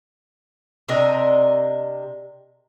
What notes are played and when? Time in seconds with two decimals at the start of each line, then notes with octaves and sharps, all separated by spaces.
0.89 C3 D4 A#4 D#5